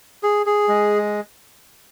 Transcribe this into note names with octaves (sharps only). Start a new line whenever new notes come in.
G#4
G#4
G#3